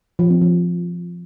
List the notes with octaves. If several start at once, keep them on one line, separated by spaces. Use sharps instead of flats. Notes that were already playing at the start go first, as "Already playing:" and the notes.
F3
C4
F3